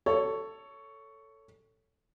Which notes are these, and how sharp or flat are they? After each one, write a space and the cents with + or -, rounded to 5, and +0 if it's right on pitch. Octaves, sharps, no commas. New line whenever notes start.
A4 +10 C#5 +10